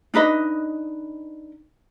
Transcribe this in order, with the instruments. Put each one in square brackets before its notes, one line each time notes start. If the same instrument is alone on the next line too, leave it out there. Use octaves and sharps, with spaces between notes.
[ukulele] D4 D#4 B4 D#5